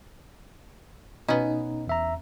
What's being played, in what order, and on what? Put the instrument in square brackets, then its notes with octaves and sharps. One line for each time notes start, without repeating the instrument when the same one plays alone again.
[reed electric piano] B2 [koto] B3 C#4 [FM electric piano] D#4
[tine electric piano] E2 E5 A#5